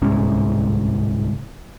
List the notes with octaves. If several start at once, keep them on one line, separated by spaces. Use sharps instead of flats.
D1 C2 G#2 C#4